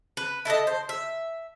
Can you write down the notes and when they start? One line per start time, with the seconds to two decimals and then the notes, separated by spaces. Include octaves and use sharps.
0.17 B4
0.45 E4 A4 C5 D#5
0.67 C5
0.89 E5